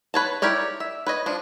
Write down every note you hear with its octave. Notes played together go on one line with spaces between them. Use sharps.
B4 C#5 A5
E4 G4 A#4 C#5 D5
E5
B4 C#5 D#5
F3 D4